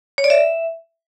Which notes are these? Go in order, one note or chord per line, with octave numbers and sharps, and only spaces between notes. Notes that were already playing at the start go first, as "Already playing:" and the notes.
C#5
D5
E5